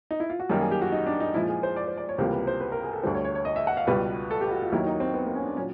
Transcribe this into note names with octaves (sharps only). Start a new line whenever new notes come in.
D#4
E4
F4
F#4
F#2 D#3 G3 A#3 G4
G#4
G4
F#4
D#4
D4
D#4
A#2 F3 G#3 E4
G#4
C5
D5
C5
D5
C#5
C#2 C3 E3 G3 A#3 C5
B4
C5
B4
A#4
G#4
A4
D2 D3 G3 C5
C#5
C#5
C#5
D#5
E5
F#5
F5
C#2 B2 G3 B4
A4
G4
F#4
F4
D#2 D#3 F#3 A#3 E4
D#4
C4
B3
A#3
C#4
D4
A#2 F#3 C#4